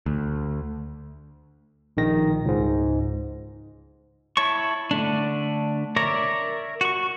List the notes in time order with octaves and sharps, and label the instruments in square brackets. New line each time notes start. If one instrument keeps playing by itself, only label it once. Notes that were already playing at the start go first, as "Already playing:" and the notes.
[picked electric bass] D2
[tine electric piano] A#1 D#3 A#6
C#2 G#2
[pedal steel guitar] E4 C#5 A5 C#6
D3 A3 D4
A#4 C#5 D5 E5 A#5
F#4 C#6